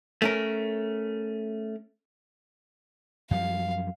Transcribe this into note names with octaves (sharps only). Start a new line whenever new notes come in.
A3 C#4 A#4
F#2 F3 G3 F5